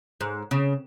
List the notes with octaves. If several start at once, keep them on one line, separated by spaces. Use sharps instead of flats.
G#2
C#3